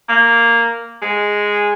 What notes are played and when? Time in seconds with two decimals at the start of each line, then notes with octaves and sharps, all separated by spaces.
0.09 A#3
1.02 G#3